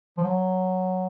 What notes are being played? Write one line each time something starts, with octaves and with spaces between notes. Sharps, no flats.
F3
F#3